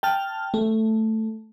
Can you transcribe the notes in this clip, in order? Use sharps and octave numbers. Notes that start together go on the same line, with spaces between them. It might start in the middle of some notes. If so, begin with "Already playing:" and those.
G5 A5 F6
A3